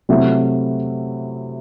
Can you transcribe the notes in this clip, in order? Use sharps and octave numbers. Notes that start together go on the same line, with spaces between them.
C3 F#3 A3 E4